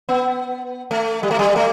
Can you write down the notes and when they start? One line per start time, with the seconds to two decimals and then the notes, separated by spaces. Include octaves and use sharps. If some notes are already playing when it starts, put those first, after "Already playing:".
0.09 B3
0.91 A3
1.23 G3
1.31 A3
1.39 G3
1.56 A3